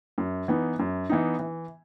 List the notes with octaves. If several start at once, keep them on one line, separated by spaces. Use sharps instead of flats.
F#2
E3 B3 D#4
F#2
E3 B3 D#4
E3